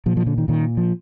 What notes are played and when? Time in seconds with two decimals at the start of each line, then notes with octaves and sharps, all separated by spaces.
0.06 A#2 F3
0.17 F3
0.27 D3
0.38 D#3
0.48 A#2 D#3
0.77 F3